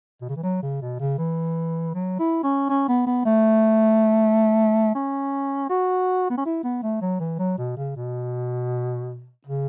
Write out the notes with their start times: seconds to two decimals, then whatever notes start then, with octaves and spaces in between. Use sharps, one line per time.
0.21 B2
0.29 C#3
0.36 E3
0.43 F#3
0.63 C#3
0.81 B2
1.00 C#3
1.18 E3
1.95 F#3
2.19 E4
2.44 C#4
2.69 C#4
2.88 B3
3.06 B3
3.25 A3
4.95 C#4
5.70 F#4
6.30 B3
6.38 C#4
6.46 E4
6.64 B3
6.83 A3
7.02 F#3
7.20 E3
7.39 F#3
7.58 B2
7.76 C#3
7.96 B2
9.47 C#3